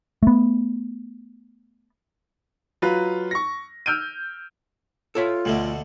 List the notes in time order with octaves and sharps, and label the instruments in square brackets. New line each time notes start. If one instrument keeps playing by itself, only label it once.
[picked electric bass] A3 B3
[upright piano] F#3 F4 B4
C#6 A#6
E6 F6 G6 D7 D#7
[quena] F4 [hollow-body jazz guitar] A4 C#5 E5
[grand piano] D2 [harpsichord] B2 D3 A3